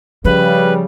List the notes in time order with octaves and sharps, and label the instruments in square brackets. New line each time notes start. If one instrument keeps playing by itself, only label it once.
[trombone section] C#3 G3 [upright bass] F3 [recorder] B4